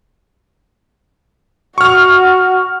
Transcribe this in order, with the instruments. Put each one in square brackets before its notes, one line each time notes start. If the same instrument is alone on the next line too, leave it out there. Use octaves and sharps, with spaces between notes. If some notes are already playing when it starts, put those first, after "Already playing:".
[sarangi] F#4 [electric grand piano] C#6 F6